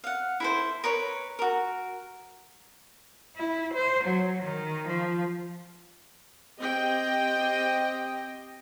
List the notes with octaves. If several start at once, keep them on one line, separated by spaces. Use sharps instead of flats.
F5 F#5
E4 A4 C5
A#4 B4 C#5
F#4 A#4
E4
C5
F#3
D#3
F3
C4 G4 D#5 G5